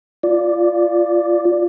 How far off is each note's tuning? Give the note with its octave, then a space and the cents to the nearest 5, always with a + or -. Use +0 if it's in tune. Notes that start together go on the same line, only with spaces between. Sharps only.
F4 +0 D5 +0